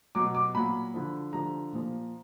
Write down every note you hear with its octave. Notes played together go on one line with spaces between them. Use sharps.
B2 F#3 D6
D6
A#2 F#3 B5
D3 F3
D3 F3 A#5
A#2 F3